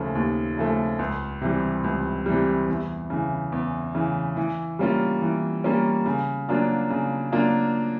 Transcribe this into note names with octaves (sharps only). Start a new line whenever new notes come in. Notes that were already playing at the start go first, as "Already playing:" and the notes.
Already playing: D#2 C#3 F3 A3
D#2
C#3 F3 A3
C#2
C3 E3 G3
C#2
C3 E3 G3
E2
C#3 E3
E2
C#3 E3
E3
G3 A#3 C#4 F4
E3
G3 A#3 C#4 F4
C#3
F#3 A#3 D4 F4
C#3
F#3 A#3 D4 F4